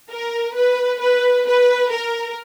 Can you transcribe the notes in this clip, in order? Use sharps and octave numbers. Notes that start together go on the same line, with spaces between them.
A#4
B4
B4
B4
A#4